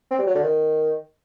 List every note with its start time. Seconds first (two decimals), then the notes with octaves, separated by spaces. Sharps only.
0.11 C4
0.19 G3
0.27 F#3
0.35 D3
0.43 D#3